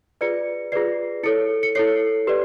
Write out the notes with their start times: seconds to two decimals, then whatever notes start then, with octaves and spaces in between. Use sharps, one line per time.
0.21 F4 G#4 B4 D5 C#7
0.72 F4 G#4 B4 D5 C7
1.23 E4 A4 C#5 C#7
1.63 C#7
1.75 E4 A4 C#5 C7
2.27 G4 B4 D5